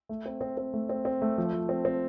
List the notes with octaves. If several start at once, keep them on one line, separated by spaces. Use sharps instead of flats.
A3
C4
C4
C4
A3
C4
C4
A3
F3
F3
C4
C4